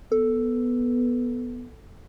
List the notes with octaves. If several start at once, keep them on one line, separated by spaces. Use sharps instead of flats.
B3 A4